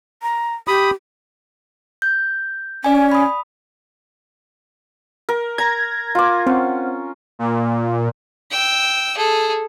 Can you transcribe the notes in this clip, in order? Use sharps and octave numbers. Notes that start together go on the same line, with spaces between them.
A#5
G4 B5 D#6
G6
C#4 D5 G#5
B5 D#6
A#4
A#5 G#6 A#6
F4 D6
C4 C#4 F#5
A#2
G5 E6
G#4 A4